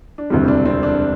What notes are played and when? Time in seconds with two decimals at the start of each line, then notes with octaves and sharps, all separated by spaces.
0.18 D4
0.30 E1 D2 C3 E3 G3 C4
0.44 C4
0.48 D4
0.66 C4
0.83 D4